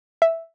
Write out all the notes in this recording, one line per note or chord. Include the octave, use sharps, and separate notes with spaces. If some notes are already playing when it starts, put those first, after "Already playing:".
E5